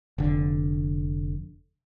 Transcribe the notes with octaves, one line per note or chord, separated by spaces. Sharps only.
F1 D3